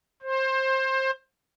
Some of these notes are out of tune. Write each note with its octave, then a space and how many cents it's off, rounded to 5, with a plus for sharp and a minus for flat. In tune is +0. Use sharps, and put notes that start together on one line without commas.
C5 +20